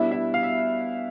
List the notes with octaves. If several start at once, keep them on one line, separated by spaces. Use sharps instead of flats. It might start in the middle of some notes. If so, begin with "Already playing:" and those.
Already playing: B2 G3 B3 D4 E4 E5
E4 E5
F5
E5